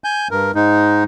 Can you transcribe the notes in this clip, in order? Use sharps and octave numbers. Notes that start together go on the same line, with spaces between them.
G#5 G6
G2 A#4
G#2 G#3 D#4